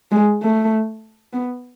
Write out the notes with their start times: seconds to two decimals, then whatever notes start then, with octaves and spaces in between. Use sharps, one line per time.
0.11 G#3
0.42 A3
1.33 B3